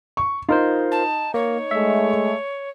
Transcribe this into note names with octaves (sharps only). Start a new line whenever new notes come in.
C#6
D#4 F4 A#4 C5
A5
A#3 C#5
G#3 A3 E5